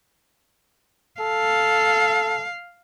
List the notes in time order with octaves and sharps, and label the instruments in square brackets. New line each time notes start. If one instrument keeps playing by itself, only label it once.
[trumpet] A4 [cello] F5